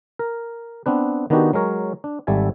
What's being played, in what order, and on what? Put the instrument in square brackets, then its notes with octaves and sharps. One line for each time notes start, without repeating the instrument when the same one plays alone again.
[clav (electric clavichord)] A#4
B3 C4 D4 B4
D#3 B3 D4 D#4 F#4 G4
F#3 G#3 A#4 C#5
D4
G#1 G3 A4 E5 G#5